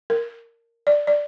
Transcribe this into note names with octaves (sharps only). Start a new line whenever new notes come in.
A#4
D5
D5